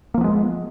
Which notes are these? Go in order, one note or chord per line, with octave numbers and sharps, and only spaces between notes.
F3 G#3 A#3 B3